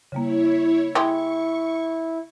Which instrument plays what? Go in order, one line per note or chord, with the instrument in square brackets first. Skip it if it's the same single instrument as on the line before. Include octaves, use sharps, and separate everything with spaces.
[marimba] C#3 G3 A#3 [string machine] E4 C#5
[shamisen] G#3 G4 [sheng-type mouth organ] E4 [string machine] C#6